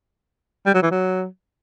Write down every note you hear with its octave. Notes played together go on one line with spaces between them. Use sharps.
G3
F#3
E3
F#3